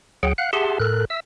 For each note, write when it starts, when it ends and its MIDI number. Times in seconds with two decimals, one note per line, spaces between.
0.23 0.33 38
0.23 0.33 54
0.23 0.33 68
0.23 0.33 78
0.23 0.33 79
0.38 0.51 77
0.38 0.51 78
0.38 0.51 90
0.53 0.78 67
0.53 0.78 68
0.53 0.78 76
0.53 0.78 78
0.53 0.78 81
0.53 0.78 84
0.80 1.05 45
0.80 1.05 69
0.80 1.05 70
0.80 1.05 90
1.10 1.20 76
1.10 1.20 88